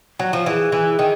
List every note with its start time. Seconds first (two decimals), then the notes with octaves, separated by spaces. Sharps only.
0.19 F#3
0.33 F3
0.46 E3 G#4
0.72 E3
0.99 D#3